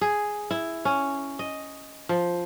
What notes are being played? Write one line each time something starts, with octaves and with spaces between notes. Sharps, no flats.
G#4
E4
C#4
D#5
F3